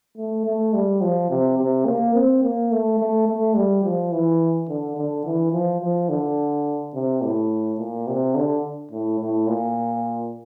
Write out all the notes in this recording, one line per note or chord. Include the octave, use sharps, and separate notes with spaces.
A3
A3
G3
F3
C3
C3
A#3
C4
A#3
A3
A3
A3
G3
F3
E3
D3
D3
E3
F3
F3
D3
C3
A2
A#2
C3
D3
A2
A2
A#2